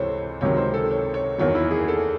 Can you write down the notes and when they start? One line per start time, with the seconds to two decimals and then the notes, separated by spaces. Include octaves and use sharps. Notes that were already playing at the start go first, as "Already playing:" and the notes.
Already playing: C#2 C3 E3 A4 C5 C#5
0.41 C#2 C3 D#3 F#3 C#5
0.57 C5
0.74 A4
0.91 C#5
1.14 C#5
1.38 F#1 E2 D#3 F#3 C#5
1.55 E4
1.71 G#4
1.88 A4